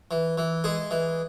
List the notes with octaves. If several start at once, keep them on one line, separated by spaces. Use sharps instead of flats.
E3
E3
G#3 G#4
E3